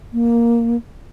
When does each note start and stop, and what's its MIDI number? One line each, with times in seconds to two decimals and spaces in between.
0.13 0.77 58